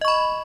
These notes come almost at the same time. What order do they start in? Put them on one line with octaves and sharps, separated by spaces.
D#5 C#6 B5